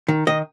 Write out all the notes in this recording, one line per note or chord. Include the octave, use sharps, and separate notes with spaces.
D#3
D#3 D#5